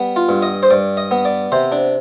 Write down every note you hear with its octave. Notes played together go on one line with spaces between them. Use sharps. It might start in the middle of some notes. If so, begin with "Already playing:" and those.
Already playing: G3 B3
F4
G2
D#5
C5
G2 D5
D#5
B3
D5
C3 C5
D4